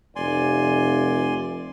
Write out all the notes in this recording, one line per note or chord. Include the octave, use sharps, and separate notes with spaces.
F1 D5 G#5 C6